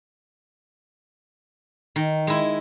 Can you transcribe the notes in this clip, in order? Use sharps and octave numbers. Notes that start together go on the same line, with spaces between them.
D#3
G#3 E4